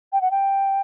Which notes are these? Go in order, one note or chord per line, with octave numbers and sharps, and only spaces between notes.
G5
F#5
G5